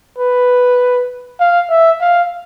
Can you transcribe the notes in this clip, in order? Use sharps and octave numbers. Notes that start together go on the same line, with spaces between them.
B4
F5
E5
F5